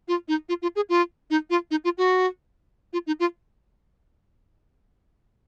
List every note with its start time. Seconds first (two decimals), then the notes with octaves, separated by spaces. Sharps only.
0.08 F4
0.28 D#4
0.49 F4
0.62 F4
0.76 G#4
0.89 F4
1.30 D#4
1.50 F4
1.71 D#4
1.84 F4
1.98 F#4
2.93 F4
3.07 D#4
3.20 F4